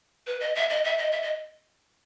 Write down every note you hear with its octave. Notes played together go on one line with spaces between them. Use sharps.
B4
D#5
E5
D#5
E5
D#5
E5
D#5